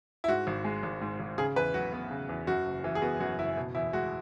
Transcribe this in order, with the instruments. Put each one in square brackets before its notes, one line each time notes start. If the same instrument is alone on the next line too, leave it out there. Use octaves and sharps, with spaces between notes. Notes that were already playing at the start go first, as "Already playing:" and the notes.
[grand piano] E4
G#2 F#4
G#1
G#3
G#1
G#2
G#1
C#3 G#4
E2 B4
F#3 F#4
B3
C#3
E2
F#2 F#4
F#1
E3
G#4
B3 F#4
F#2 F#4
F#1 E4
B2
E2 E4
G#3 F#4